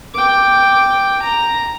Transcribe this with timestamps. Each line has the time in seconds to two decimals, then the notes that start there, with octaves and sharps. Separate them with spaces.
0.14 G5 D6
1.22 A#5